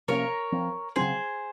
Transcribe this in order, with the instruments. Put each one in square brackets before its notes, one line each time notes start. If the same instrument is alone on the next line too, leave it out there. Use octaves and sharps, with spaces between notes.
[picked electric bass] C3 F3 A#3 C#4 [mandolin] A#4 C#5
[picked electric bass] F3 C4
[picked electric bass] C#3 F#3 C4 [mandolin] G#4 C5